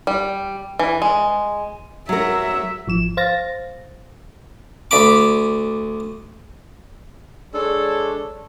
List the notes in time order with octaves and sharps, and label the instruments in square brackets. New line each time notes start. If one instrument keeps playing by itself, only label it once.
[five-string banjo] G3
E3
G#3
[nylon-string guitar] F#3 A#4 [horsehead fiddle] E5
[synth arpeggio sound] G#1 F3 E7
C5 F5 A6 A#6
[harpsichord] D2 D5 B5 D6
[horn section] G#3 D4 A4 C#5